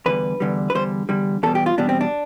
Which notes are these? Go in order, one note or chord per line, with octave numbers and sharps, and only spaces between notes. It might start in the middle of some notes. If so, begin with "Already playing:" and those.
E2 D3 G3 B4
E2 D3 G3
B4
E2 D3 G3 C5
E2 D3 G3
E2 B2 G3 A4
G4
F4
E2 B2 G3 D4
C4
D4